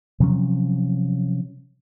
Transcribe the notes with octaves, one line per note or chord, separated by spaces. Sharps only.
C3 F3 F#3 C#4